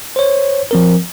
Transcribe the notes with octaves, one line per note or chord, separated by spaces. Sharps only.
C5 C#5
F3 C4 A#4